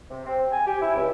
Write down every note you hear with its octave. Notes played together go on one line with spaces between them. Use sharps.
C3
C4
G#5
G4
E4
C#2